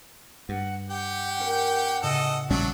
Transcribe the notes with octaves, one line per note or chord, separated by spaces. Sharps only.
G2 F#5
G4 F#5 G5
C#4 A#4 C5
A2 C#3 A4 D#5
A#1 F#3 G3 C#4 D4 E4